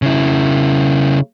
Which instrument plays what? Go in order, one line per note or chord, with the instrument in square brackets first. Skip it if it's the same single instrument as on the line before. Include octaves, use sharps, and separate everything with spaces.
[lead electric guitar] C#3 E4